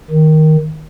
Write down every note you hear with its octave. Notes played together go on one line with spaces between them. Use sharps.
D#3